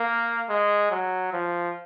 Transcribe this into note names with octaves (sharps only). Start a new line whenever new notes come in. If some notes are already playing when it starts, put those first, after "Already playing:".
Already playing: A#3
G#3
F#3
F3